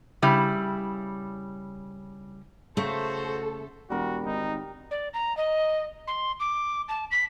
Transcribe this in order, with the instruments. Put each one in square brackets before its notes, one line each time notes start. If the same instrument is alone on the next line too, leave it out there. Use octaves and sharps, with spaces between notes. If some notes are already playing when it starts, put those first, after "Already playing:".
[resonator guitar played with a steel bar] C#3 G3 E4
[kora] C#3 [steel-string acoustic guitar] A3 [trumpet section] F#4 C5 [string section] A4
[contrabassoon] E1 [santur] G3 A#4 [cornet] F#4
[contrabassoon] G#1 [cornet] D#4
[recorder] D5
A#5
D#5
C6
D6
A5
B6